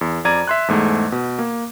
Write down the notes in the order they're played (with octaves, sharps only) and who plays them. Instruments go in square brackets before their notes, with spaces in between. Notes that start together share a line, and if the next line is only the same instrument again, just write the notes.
[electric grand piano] E2
F2 D5 A#5 G#6 D#7
E5 C6 F#6
E2 G#2 A3
B2
A#3